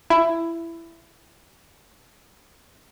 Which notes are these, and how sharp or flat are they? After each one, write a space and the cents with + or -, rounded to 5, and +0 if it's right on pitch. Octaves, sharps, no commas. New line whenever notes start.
E4 +15